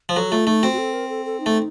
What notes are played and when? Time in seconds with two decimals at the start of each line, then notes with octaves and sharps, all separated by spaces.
0.09 F3
0.16 F#3 A4
0.31 A3 F4
0.47 A3 D#4
0.62 C4 F#4
0.73 F#4
0.78 A4
0.93 A#4
1.09 A4
1.25 A4
1.40 D#4
1.46 A3